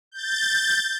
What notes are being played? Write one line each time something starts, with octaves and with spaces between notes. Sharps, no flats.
G6 A6